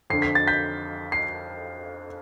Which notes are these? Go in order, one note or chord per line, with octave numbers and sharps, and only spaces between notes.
F2 D3 C7
B6
A6
G6 B6
C7